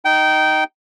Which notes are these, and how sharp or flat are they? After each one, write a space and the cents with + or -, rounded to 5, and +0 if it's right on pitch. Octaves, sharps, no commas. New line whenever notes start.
D#4 +0 G5 -20